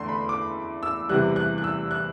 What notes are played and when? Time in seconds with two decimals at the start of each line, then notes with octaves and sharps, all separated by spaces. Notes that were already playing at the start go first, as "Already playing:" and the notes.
Already playing: E2 D3 A3 C6
0.09 B5
0.29 D6
0.83 E6
1.09 E2 C3 E3 G3 F#6
1.36 F#6
1.58 F#6
1.64 E6
1.91 F#6